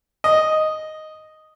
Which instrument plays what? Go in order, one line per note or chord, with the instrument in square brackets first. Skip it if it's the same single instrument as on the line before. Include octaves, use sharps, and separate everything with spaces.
[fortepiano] D#5